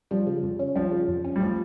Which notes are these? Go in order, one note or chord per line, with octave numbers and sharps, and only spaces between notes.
F3 G3
C#3
F2
C#4
F3 G3
C#3
F2
C#4
G3
F3 A3